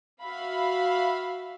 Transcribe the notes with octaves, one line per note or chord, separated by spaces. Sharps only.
F#4 E5 F5 B5